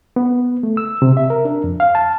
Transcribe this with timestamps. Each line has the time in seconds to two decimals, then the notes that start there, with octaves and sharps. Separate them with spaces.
0.16 B3
0.63 A3
0.77 E6
1.02 C3
1.17 E5
1.30 A#4
1.45 D4
1.64 F2
1.80 F5
1.95 A5